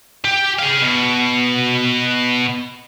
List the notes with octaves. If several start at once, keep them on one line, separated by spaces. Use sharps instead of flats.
G4
G#4 F5
B2